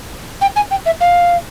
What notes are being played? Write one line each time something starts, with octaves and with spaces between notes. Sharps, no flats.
G5
G#5
G5
E5
F5